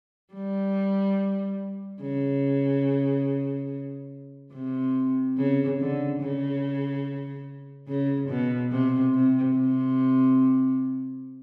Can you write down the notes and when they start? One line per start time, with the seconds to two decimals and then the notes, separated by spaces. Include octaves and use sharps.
0.34 G3
2.02 C#3
4.53 C3
5.37 C#3
5.79 D3
6.21 C#3
7.88 C#3
8.29 B2
8.72 C3
9.14 C3
9.56 C3